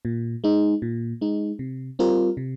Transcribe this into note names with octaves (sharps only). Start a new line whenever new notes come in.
A#2
G#3 D#4
A#2
G#3 D#4
C3
G3 C4 F4 A#4
C3